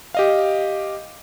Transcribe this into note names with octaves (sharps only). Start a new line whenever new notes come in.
G4 D#5 F5